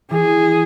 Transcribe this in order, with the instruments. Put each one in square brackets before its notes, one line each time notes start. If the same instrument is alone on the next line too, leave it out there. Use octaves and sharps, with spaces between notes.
[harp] E3 [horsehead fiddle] G#4